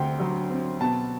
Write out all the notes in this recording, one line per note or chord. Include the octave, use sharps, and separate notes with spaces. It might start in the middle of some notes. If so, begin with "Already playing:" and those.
Already playing: D2 D3 C4 G5
F#3
C4
B2 A5